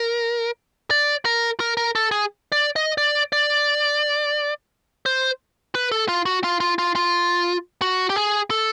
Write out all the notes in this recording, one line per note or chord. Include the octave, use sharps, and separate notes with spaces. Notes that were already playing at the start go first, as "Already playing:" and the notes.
Already playing: A#4
D5
A#4
A#4
A#4
A4
G#4
D5
D#5
D5
D5
C5
B4
A4
F4
F#4
F4
F4
F4
F4
F#4
G4
G#4
A4